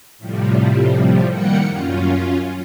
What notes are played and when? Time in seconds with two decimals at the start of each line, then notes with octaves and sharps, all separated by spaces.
0.18 A2 C3 F3 G3
1.30 D#3 G3 A#3 G4 F#5 C#7
1.68 F#2 C#4 F4